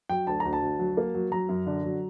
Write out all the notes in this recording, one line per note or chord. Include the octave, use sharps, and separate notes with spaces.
F#3 G5
D2 A5
D2 A#5
A5
D2
F#3
A#3
F#3
F#3 A#5
F#2
D3
F#3